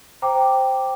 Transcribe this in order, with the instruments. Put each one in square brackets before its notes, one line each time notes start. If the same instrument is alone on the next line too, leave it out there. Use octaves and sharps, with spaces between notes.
[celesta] C5 G5 A#5 D6